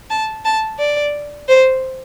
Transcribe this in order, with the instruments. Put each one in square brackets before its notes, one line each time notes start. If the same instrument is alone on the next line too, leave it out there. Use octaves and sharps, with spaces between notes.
[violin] A5
A5
D5
C5